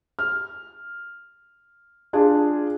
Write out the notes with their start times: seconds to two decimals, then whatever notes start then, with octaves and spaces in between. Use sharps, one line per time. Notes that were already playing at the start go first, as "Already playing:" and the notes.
0.19 F6
2.13 D4 F4 G#4